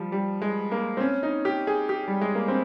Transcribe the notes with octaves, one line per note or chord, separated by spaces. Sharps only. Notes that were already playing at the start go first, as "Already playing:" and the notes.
Already playing: F3 G3
G3
G#3
A#3
C4
C#4
D#4
G4
G#4
G4
G3
G#3
A#3
C4